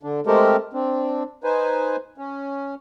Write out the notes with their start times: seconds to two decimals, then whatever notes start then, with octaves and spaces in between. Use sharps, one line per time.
0.03 D3 D4
0.27 G#3 A3 C4 G4 A4 A#4
0.73 C4 D4
1.44 D#4 B4 C5 G#5
2.18 C#4